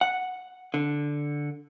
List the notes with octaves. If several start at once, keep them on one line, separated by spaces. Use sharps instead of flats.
F#5
D3